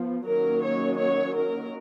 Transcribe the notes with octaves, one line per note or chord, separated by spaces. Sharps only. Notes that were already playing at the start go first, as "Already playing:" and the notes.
Already playing: F3 B3
D#3 F#3 A#3 C#4 A#4
C#5
C#5
A#4